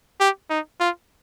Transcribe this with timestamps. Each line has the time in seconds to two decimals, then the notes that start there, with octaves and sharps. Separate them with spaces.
0.20 G4
0.50 D#4
0.80 F4